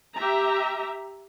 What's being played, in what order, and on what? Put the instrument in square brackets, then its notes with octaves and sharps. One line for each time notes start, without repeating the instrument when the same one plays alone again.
[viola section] G4 E5 A#5